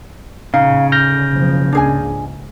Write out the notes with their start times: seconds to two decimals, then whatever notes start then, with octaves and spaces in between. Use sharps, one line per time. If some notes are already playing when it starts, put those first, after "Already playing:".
0.54 A1 A#2 C#3 D#4 F5
0.92 D3 F6 G6 A#6
1.31 F#1 B2 F3
1.73 C#2 G#2 A#3 D4 G#4 G#5